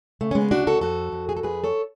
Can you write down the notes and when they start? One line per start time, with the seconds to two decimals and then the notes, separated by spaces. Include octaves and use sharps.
0.21 C#3 A3
0.31 C#4
0.35 G#3 B3
0.51 D2 D4 F#4
0.67 F#4 A4
0.81 F2 F#4 A4
1.12 F2
1.29 G#4
1.37 A4
1.43 F2 G#4 B4
1.64 A4 C#5